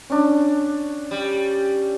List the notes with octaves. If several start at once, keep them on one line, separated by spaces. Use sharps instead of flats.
C#4 D4
G3